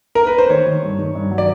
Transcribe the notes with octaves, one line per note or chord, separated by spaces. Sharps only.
A#4
B4
C5
D#3 C#5
D#3
G2
D#3
G2
F#3
D5